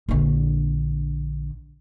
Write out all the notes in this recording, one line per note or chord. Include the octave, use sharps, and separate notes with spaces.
A#1 D3